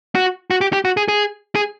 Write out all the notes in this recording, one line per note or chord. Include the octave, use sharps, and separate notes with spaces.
F#4
F#4
G4
G4
F#4
G#4
G#4
G#4